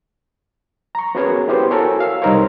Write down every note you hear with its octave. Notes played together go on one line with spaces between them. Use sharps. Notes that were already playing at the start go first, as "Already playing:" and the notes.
A#5 C#6
B3 C#4 F#4 G#4 A#4 C#5
B3 E4 G4 C5
F#4 A4 A#4 C#5 G#5
F5 E6
C2 G3 D#4 A#4 C5 C#5